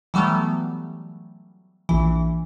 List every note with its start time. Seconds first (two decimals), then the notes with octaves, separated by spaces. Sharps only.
0.14 E3 F#3 G3 A3 B3
1.89 A#1 E3